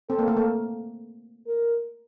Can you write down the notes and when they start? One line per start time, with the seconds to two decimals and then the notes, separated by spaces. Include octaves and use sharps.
0.09 C4 A4
0.19 A#3
0.28 A3
0.37 A#3
1.47 A#4